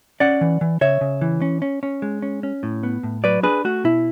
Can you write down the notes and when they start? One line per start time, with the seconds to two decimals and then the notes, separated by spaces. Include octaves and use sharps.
0.20 C#4 D5 F#5
0.41 E3
0.61 E3
0.81 C#3 C#5 E5
1.01 C#3
1.21 E3
1.42 C#4
1.62 C#4
1.83 C#4
2.02 G#3
2.22 C#4
2.43 C#4
2.63 A2
2.83 B3
3.03 A2
3.24 F#3 B4 D5
3.43 D4 G#4 B4
3.65 A3 F#4
3.84 B2 E4